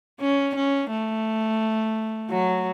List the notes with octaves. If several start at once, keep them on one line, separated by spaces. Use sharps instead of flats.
C#4
C#4
A3
F#3